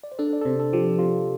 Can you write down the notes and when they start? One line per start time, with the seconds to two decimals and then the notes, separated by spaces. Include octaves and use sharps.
0.04 D5
0.12 C5
0.19 D4 A4
0.33 D5
0.41 A4
0.45 C3 C5
0.60 A4
0.73 F3 G4
0.99 C3 F4